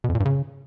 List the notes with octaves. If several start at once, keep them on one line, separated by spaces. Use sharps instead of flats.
B2
F2
A#2
G2
C#3